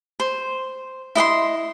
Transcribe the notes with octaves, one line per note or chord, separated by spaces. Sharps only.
C5
E4 D#5 F#5 C6